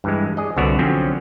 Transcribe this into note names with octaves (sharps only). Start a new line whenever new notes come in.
G2 E3 G#3
G#4 D5 D#5
C2 D3 B3 F#4 C#5 D5
D3 F3 F#3 C4 C#4